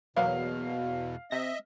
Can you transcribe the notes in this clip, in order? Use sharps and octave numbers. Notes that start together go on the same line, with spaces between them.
E2 B2 F#3 A#3 B3 F5
C3 D#5 E5 A#6